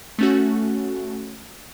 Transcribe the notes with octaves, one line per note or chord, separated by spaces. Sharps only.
A3 C#4 F#4